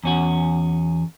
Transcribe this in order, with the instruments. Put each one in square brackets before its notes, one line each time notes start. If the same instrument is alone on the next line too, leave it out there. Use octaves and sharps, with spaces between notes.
[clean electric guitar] E2 C#4 F#4